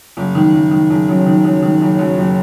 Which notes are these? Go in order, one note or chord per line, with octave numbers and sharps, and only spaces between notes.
F#1
D#3
F#1
D#3
F#1
F#2
D#3
F#2
D#3
F#1
F#2
F#1